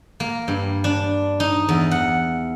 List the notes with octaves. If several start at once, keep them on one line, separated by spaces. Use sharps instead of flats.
A#3
G2
D4
D#4
E2
F#5